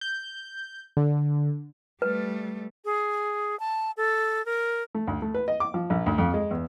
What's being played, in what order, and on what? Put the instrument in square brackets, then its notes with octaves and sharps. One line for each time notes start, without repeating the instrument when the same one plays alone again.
[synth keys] G6
D3
[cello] G3 A3 [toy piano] B4
[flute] G#4
A5
A4
A#4
[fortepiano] A3
D2
A3
B4
D#5
D6
F3
A#1
D2
F2
G#3
E2